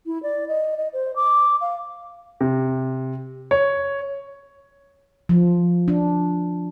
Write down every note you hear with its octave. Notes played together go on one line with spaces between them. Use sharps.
E4
D5
D#5
D#5
C5
D6
F5
C3
C#5
F3
D4